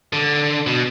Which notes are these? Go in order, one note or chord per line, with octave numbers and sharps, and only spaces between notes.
D3
B2